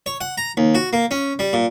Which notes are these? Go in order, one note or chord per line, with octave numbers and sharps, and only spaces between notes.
C#5
F#5
A#5
D#2
F#4
A#3
C#4
G3
A#2